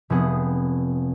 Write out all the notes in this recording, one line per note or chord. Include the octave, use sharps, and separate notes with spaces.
F1 B3 C4 G#4 F#5